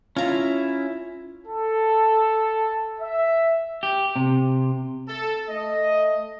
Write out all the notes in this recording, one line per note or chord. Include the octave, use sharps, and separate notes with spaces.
C#4 E4 F4 A#5
A4
E5
G4
C3
A4
A3 D#5